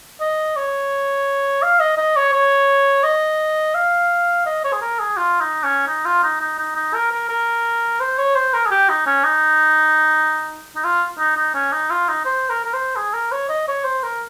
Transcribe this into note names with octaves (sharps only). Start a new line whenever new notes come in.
D#5
C#5
F5
D#5
D#5
C#5
C#5
D#5
F5
D#5
C#5
G#4
A#4
G#4
F4
D#4
C#4
D#4
F4
D#4
D#4
D#4
D#4
A#4
A#4
A#4
C5
C#5
C5
A#4
G#4
G4
D#4
C#4
D#4
D#4
F4
D#4
D#4
C#4
D#4
F4
D#4
C5
A#4
A#4
C5
G#4
A#4
C#5
D#5
C#5
C5
A#4